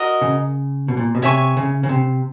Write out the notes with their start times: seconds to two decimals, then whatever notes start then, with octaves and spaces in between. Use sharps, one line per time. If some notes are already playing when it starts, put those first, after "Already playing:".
Already playing: F#4 A#4 D#5
0.22 C#3
0.88 B2
0.97 A#2
1.15 B2
1.22 C3 C#5 E5 G#5 C#6
1.57 C#3
1.83 C#3
1.89 C3